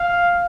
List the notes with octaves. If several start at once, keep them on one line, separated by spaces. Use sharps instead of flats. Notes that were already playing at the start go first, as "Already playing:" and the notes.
Already playing: F5